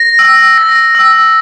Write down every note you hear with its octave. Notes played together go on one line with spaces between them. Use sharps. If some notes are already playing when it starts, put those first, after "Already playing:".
Already playing: A#6
E6
A#6
E6